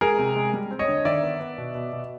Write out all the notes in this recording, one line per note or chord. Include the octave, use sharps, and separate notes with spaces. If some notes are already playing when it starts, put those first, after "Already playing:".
G#3 G#4 A#4
C3
G#3
G3
C4
C#5 D#5
D3
D#3 D5 E5
B3
B3
B2
B2
B2